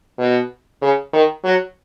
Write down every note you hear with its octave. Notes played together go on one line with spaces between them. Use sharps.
B2
C#3
D#3
F#3